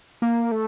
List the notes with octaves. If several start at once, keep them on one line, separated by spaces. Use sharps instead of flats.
A#3
A3